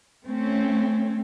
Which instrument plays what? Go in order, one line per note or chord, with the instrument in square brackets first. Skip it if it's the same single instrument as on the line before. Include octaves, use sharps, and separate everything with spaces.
[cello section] A3 C4 C#4